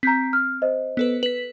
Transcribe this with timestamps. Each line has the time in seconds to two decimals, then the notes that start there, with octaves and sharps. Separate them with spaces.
0.03 C4 A#5 G6 B6
0.33 F6
0.62 C5 D#5
0.97 B3 A4 B4
1.23 B4 B6 F#7